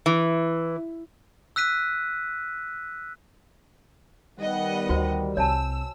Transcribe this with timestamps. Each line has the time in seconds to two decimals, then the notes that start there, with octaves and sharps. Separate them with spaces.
0.06 E3
1.56 E6 F#6 B6 D#7
4.39 D#3 G3 B3 D#5 F#5
4.89 D2 A3 F#4 C5
5.37 C2 C#5 G#5 A5 E6